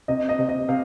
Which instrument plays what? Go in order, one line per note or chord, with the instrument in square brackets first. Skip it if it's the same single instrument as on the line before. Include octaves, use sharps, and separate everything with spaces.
[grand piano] C3 D#5
D#5
C3
D#5
C3 F5